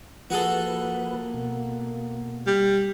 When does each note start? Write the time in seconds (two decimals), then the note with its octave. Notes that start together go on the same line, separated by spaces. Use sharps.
0.30 F3 A#3 F#4 G#4 A4 B4
1.34 B2
2.47 G3